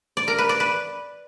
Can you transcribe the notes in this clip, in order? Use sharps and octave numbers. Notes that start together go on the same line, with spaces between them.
D5
A#4
B4
D5
B4